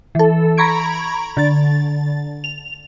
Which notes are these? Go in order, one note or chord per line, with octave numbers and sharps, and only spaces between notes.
E3 A4
A#5 B5 C#6 G#6 D7
D3 A6
F7